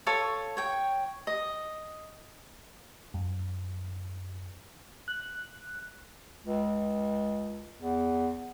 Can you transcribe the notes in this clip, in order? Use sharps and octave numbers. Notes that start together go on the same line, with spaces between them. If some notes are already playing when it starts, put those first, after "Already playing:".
F4 A4 C#5 C#6
C#5 G5
D#5
F#2
F#6
C#2
E2